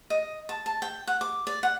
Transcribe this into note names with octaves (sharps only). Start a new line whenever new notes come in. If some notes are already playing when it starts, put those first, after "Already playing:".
D#5
A5
A5
G5
F#5
D6
D5
F#5